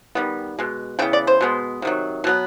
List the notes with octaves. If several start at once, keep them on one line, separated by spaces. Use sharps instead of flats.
D#3 G3 B3
B2 G#3
C#3 E3 B3 G5
D5
C5
B2 G#3 B3
C3 D#3 F#3
B2 F#3 B3